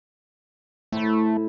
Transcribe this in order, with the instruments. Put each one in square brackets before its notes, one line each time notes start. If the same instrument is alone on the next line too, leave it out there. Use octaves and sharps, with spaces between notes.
[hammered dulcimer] A2 C5 B5 [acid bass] A3